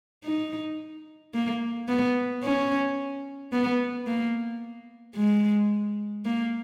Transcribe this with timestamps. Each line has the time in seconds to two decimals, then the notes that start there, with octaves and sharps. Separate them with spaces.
0.24 D#4
1.34 A#3
1.88 B3
2.43 C#4
3.52 B3
4.07 A#3
5.16 G#3
6.25 A#3